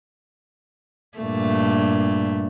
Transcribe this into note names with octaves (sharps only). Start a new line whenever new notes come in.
G2 A#2 A3